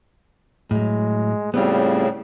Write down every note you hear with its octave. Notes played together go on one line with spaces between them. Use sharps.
A2 F#3 G#3
A2 C#3 G3 B3 C4 F4